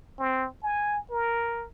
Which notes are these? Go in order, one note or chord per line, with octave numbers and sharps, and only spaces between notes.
C4
G#5
A#4